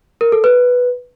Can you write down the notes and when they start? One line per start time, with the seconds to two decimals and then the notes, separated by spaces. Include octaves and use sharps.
0.21 A#4
0.32 A4
0.44 B4